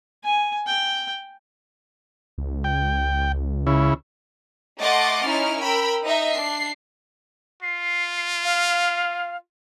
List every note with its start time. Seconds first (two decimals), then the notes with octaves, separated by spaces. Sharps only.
0.24 G#5
0.67 G5
2.38 C#2
2.64 G5
3.67 C#3 E4
4.79 A3 D#5 F#5 C6 D6 A6
5.27 C#4 D#4 E4 F6
5.60 A#4 G5 B5 E6
6.03 D#4 D#5 E5
6.35 D4 C7
7.63 F4 C7
8.44 F5